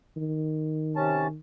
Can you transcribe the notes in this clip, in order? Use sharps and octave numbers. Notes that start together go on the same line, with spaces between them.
D#3
C3 C#4 A5